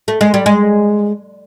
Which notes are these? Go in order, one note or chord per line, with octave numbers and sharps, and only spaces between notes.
A3
G#3
G3
G#3